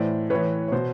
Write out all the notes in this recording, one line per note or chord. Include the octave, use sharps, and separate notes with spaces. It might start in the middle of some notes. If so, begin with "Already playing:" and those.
Already playing: A2 E3 C5 D5
A2 E3 B4 C#5
C#5
B2 C5